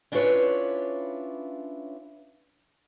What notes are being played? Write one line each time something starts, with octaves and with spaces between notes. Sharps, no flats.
C#4 D4 E4 F4 B4 C#5